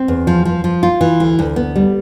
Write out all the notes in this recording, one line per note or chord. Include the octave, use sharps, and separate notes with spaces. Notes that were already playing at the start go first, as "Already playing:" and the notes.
Already playing: C4
E2
F3
F3
F3
F4
E3
D2
D2
B3
G3